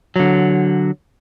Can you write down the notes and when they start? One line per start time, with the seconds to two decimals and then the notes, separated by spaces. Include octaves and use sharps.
0.16 D3 F#3